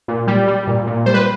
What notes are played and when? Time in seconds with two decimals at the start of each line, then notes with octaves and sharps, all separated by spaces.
0.08 A#2
0.27 G3
0.48 G3
0.67 A#2
0.87 A#2
1.06 G3 C5
1.14 B4